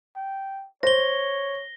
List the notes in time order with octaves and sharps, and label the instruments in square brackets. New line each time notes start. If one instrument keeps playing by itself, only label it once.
[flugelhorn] G5
[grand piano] C5 [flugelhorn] C#5 [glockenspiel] A#6 G7